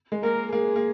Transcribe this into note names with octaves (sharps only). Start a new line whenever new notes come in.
G#3
A#3 A#4
A#3 G#4
A#3